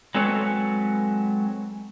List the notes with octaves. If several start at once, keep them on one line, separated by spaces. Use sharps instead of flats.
F#3 G#3 C4 A4 B4 C#5